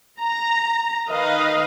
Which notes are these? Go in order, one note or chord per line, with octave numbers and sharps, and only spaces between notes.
A#5
D#3 B4 D#5 F5